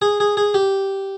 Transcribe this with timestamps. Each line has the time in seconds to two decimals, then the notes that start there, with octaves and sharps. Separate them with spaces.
0.02 G#4
0.20 G#4
0.37 G#4
0.54 G4